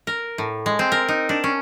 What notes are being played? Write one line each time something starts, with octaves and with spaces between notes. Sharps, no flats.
A#4
A2
G#3
C4
A#4
D#4
D4
C#4